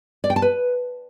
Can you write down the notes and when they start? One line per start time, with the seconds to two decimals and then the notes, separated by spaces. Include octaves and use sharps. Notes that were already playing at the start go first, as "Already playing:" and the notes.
0.24 D5
0.30 G5
0.36 A5
0.42 B4